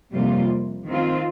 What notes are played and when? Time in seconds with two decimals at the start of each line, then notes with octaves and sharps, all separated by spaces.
0.12 F2 C3 G3 A#3 F4
0.87 D#3 C4 F4